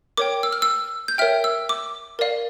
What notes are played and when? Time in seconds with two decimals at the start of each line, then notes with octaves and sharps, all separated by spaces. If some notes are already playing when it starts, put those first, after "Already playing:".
0.17 A#4 C#5 G5 D6
0.43 E6
0.53 F6
0.62 E6
1.08 G6
1.18 A#4 C#5 E5 G5 F6
1.44 E6
1.69 D6
2.19 A#4 D5 F5